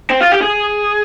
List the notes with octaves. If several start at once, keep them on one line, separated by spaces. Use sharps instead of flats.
C4
F4
G4
G#4